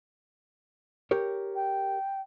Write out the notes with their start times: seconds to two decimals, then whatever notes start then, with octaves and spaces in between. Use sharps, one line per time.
1.11 G4 A#4 C#5
1.55 G5